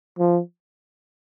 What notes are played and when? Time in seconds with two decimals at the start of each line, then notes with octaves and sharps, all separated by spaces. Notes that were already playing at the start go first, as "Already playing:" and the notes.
0.19 F3